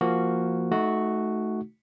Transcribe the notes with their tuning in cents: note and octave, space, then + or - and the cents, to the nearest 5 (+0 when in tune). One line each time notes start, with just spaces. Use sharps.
F3 -15 A#3 -5 F#4 +0
A3 -20 D#4 +0 F#4 +0